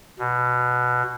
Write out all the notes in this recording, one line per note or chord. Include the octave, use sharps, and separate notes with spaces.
B2